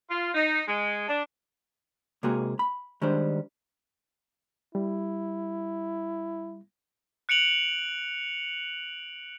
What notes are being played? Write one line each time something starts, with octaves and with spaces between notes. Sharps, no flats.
F4
D#4
G#3
D4
C3 G#3 A#3 F#4 G#4
B5
D#3 G3 G#3 D4 C5
G3 E4
F#6 C#7 D7 F7 F#7